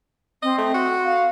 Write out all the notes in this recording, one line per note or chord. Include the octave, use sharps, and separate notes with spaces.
C4 D#5
A3
F#4
F5